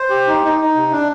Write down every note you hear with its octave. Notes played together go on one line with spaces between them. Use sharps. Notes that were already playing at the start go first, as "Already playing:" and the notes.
Already playing: C5
G4
D#4
D#4
D#4
C3
D4